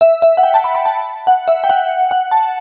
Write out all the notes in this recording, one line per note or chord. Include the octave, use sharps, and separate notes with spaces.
E5
E5
F#5
G5
A5
B5
B5
A5
F#5
E5
G5
F#5
F#5
A5